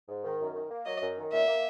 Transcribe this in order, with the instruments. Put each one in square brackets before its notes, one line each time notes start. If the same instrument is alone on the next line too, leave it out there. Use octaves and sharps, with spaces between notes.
[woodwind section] G#2
D#3
F#2
D#3
A#3
[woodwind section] F#3 [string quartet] D#5
[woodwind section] F#2
D#3
[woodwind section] A#2 [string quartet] E5
[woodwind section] A#3